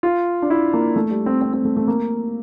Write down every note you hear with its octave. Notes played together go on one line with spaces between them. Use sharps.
F4
D4
E4
A#3
A3
G3
C4
C4
C4
A3
A3
A#3